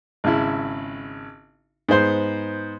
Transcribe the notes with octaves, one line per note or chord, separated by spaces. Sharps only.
G#1 C#3 E4
G#2 B3 C5 C6